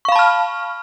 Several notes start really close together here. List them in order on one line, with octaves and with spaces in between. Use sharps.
C#6 F5 B5 A5 F6